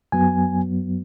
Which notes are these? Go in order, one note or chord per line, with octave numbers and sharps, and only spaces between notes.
F#2 F#3 B3 G#5